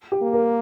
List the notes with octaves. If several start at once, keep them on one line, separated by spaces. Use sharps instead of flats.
G4
A#3
A#4